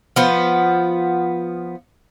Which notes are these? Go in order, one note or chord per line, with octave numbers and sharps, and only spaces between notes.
F3 B3